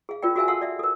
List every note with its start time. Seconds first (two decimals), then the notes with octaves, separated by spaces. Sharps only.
0.09 G#4 F5
0.23 F4 A#4 D5 G5
0.36 F#4 G#4 A#4 E5 F5 G#5
0.48 A4 F5 F#5 A5 C6 E6
0.62 D5 E5 F5
0.79 A4 A#4